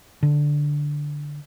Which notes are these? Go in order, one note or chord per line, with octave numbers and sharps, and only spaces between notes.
D3